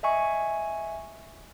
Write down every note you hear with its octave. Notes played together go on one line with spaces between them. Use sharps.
D#5 E5 G#5 C#6